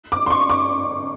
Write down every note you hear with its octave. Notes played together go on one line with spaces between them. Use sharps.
D6
C6
C#6
D6